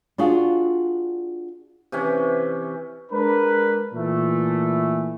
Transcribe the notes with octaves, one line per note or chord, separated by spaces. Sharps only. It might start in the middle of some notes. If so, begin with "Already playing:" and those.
D4 F4 F#4 G#4
C3 E3 C#4
G#3 D4 A#4 B4
A#2 E3 A3